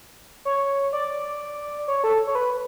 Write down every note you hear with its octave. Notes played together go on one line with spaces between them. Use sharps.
C#5
D5
C#5
A4
C#5
B4